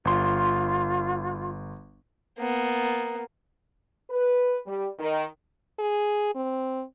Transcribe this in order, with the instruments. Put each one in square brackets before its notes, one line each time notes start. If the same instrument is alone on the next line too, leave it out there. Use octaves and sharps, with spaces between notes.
[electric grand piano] G1 C6 [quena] F4
[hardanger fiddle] A#3 B3
[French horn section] B4
G3
D#3
[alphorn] G#4
C4